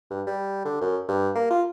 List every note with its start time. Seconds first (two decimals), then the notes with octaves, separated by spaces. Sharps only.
0.11 G2
0.27 G3
0.65 D3
0.81 F#2
1.08 G2
1.35 A#3
1.51 F4